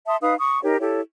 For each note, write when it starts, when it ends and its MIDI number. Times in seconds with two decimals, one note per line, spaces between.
0.07 0.16 76
0.07 0.16 81
0.07 0.16 84
0.07 0.16 87
0.21 0.34 63
0.21 0.34 71
0.21 0.34 77
0.21 0.34 87
0.39 0.61 85
0.39 0.61 87
0.63 0.78 63
0.63 0.78 67
0.63 0.78 70
0.63 0.78 73
0.80 1.01 64
0.80 1.01 67
0.80 1.01 69
0.80 1.01 73